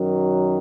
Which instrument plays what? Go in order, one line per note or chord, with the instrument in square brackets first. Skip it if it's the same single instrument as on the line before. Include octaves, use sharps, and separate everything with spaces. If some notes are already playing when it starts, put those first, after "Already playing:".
Already playing: [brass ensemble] F#2 D#3 F#3